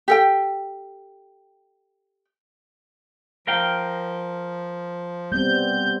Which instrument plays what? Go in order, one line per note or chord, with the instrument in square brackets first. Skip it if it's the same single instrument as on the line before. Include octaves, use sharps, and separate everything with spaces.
[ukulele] G4 A4 G5
[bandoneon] F3 [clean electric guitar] A#4 F5 G5
[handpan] G3 B3 C4 [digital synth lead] G6